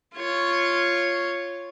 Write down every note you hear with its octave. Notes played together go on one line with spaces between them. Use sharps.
F4 C#5